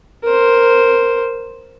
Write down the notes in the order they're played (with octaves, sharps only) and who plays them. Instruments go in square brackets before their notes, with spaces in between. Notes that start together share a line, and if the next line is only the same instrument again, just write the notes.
[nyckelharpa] A#4 C5